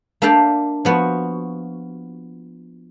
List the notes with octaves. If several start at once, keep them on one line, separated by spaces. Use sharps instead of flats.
A#3 D4 E5 F5 G5 A5
F3 B3 F#4